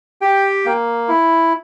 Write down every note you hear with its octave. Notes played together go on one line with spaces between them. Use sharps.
G4 G5
A#3
E4